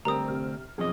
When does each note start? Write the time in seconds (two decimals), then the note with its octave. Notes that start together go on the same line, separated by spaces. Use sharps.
0.05 D2 G3 C4 A#4 A#5 D#6
0.28 C3 F6
0.78 B1 F2 G#4 D#5